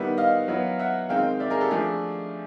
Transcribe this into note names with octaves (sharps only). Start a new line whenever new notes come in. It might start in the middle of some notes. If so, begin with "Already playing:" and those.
Already playing: D#3 G3 B3 E4
D#5 F5
F#3 B3 E4
E5 F#5
D#3 G#3 C4 D#4 F5 G5
D5 E5
G#4 A#4
G4 A4
F3 A3 D4 G#4